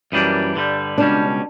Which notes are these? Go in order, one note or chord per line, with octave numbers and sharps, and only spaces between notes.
F#2 E3 G3 A#3 D4
G2 D3 G3
C#2 B2 G3 C#4 D4